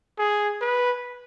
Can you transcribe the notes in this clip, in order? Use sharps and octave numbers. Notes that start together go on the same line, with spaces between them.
G#4
B4